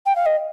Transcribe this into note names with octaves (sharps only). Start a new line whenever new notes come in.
G5
F5
D#5